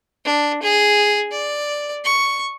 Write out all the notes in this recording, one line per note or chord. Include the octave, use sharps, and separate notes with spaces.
D4
G#4
D5
C#6